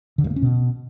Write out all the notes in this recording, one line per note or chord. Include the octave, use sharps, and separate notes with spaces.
D3
G2
A#3
C#4
B2